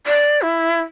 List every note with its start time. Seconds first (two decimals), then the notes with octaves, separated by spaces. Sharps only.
0.06 D5
0.41 E4